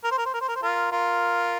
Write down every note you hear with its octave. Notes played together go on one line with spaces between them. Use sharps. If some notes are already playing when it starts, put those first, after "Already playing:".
A#4
C5
A#4
C5
A#4
C5
A#4
C5
F4 A#4
F4 A#4